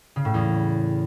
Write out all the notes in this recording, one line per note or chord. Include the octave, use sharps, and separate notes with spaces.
C#3
A2
E2